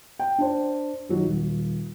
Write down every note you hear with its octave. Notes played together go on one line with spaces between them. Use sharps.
G5
D4 C5
D#3 F#3
D#1